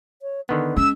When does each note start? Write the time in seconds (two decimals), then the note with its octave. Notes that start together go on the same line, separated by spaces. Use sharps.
0.22 C#5
0.49 D3 D#3 B3 B4
0.77 G#3 C#4 E6